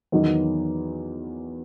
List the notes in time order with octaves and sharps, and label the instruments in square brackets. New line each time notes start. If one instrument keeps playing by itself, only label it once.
[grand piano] E2 D#3 F#3 B3 D#4